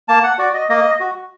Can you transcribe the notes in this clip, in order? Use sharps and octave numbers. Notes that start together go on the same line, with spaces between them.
A#3 A5
F#5
F#4 D5
D#5
A#3 D#5
F#4